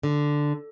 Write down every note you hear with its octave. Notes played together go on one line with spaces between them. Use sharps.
D3